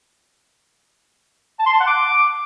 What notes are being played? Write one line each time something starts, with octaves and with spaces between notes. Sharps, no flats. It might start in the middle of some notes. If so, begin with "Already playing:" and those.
A5
C6
A5
F#5
D6